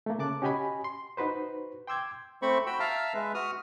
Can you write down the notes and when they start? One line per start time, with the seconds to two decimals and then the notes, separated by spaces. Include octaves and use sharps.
0.06 A3 A#3
0.19 C#3 A5 D6 F#6
0.42 C#4 F#4 G4 D#5 G#5 B5
0.84 C6
1.17 D#4 F#4 B4 C5
1.87 G5 C6 D6 E6 G6 G#6
2.42 A3 C4 C5 B5 C#6
2.67 F#4 G5 B5 E6
2.80 E5 F5 A5 A#5 E6 F6
3.14 G#3 B4 E5
3.34 F#4 D#6 F6